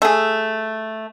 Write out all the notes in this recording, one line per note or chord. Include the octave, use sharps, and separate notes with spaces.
A3 G#4